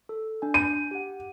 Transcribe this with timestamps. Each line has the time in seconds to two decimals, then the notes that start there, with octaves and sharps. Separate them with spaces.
0.09 A4
0.42 D4 G#5
0.54 G6 D#7
0.91 G4 F#5